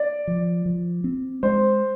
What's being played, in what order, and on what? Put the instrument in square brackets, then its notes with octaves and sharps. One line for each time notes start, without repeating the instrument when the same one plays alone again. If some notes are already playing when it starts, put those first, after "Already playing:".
Already playing: [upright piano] D5
[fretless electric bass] F3
F3
C4
[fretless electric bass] G#3 [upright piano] C5